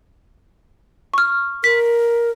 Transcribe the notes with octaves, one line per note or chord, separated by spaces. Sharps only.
C#6 F6
A#4 B6